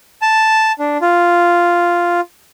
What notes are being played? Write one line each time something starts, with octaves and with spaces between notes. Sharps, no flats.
A5
D4
F4